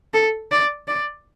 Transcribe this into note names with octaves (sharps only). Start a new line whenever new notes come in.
A4
D5
D5